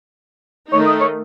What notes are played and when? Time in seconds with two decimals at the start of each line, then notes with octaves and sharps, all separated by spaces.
0.72 D#3 A3 D#4 C#5
0.86 D#5
1.01 C#5